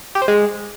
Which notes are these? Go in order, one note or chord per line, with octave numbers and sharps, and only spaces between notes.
G4
C5
G#3